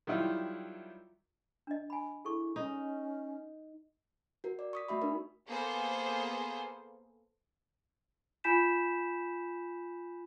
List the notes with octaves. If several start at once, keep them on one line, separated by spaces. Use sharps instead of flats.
D#3 F#3 G3 E4 F4
D4 D#5
G#5 B5
E4 G#4 A4 C#6
C#4 D#4
F#4 A#4
D5
C#6 D#6 B6
A3 F#4 E5 B5
D4 D#4 A#4
A#3 B3 G#4 A4 C5
F4 G#5 B5 G6 B6 E7